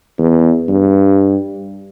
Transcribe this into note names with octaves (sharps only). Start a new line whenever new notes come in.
E2
G2